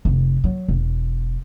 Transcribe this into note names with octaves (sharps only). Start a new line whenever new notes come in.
F1
F#3
E1